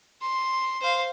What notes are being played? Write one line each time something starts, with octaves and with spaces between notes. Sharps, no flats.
C6
C5 F5